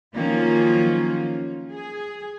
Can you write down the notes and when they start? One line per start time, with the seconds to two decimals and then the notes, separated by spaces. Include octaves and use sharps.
0.15 D#3 F3 F#3 A#3 C#4 F4
1.71 G#4